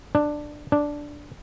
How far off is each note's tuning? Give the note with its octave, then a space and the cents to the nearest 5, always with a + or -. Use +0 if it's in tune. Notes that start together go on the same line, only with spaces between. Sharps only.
D4 +10
D4 -5